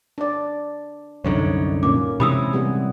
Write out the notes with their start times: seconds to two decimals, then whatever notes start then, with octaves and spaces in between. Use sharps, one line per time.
0.18 D4 D5
1.25 C2 F#2 D3 D#4 C#5
1.83 A#2 A#3 C#4 D6
2.20 C3 E3 G#3 B5 D#6 E6
2.53 G3 B3 G#4